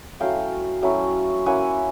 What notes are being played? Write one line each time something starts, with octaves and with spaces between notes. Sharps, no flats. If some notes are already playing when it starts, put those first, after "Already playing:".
F#3 A3 C#4 E4 F5 G5
F#3 A3 C#4 E4
A#3 C#4 E4 F#5 G#5